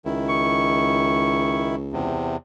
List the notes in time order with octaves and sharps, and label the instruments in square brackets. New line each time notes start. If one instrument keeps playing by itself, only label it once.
[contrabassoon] C#2 [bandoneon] D#3 E4
[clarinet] C#6
[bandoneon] E2 C3